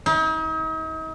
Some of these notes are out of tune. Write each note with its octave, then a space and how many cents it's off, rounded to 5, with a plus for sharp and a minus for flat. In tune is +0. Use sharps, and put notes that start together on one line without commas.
D#4 +40